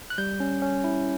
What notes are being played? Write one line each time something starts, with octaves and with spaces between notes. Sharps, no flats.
F#6
G3 G6
C#4
C#4
E4